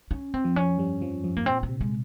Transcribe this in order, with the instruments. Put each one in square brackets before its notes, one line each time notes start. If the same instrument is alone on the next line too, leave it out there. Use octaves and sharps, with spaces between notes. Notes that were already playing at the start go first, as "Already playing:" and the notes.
[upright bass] C#4
C4
[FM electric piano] F2 F3
[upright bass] C#4
[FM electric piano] G2 G3
F2 F3
F2 F3
[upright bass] A#3
[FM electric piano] A#2 [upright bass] C4
[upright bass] C4
[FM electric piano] C3
[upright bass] G#3